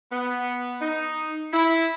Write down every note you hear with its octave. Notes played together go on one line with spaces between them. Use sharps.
B3
D#4
E4